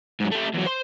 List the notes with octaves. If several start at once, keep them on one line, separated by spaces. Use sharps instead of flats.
G#2 F#3
A3 G4
E2 F#3
C5 C6